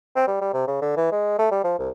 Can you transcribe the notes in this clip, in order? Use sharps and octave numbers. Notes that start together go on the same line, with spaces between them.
C4
G3
G3
C3
C#3
D3
E3
G#3
A3
G3
F3
C2